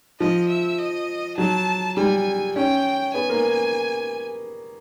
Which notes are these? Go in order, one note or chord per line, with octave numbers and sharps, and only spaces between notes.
F3 D#5
E5
D#5
F#3 A5
G3 G#5
C#4 G5
B3 G#5
A#3